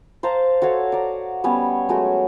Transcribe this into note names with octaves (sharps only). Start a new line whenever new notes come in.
C5 F5 A5 A#5
F#4 A4 C#5 F5
D5 A#5
G3 B3 C#4 C#5
F#3 G#3 A3 F#4